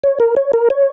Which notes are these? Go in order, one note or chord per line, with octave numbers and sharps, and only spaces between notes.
C#5
A#4
C#5
A#4
C#5